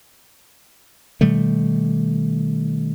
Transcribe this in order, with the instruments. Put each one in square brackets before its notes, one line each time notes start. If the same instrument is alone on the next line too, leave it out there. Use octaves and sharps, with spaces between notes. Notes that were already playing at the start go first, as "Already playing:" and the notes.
[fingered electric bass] B2 D#3 G3 A3